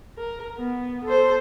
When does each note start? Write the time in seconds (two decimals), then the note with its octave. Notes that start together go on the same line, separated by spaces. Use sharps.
0.18 A#4
0.58 B3
1.05 A4 C5